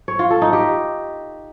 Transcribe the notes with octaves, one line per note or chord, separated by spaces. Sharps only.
C#5
F4
A4
D#4
G4